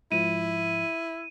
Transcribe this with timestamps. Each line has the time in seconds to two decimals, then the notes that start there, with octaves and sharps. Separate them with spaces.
0.12 G#2 F3 E4 D#7